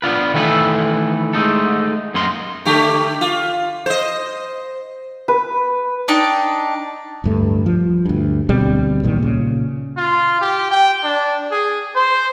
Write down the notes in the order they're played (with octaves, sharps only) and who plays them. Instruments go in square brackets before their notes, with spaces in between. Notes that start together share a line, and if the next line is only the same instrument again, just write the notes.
[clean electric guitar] B3 D4 F4 B4
D#3 E3 A3 E4 A4 B4
G#3 A3 D#4 A4
F#2 A#3 D#4 C6
[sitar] D3 A3 G4
F4
C5 D#5
[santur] B4
[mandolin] D4 D#4 G5 A5
[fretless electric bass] D1 G2 A3
F3
D2 G2
D2 B2 G3 C4
B1 A#2 D#3
A#2 C#3
[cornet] F4
G4
G5
D4
G#4
C5